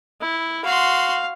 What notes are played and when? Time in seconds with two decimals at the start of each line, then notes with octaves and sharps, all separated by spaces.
0.21 E4
0.65 F#4 F5 C6